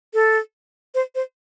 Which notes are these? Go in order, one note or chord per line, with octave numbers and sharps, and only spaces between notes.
A4
C5
C5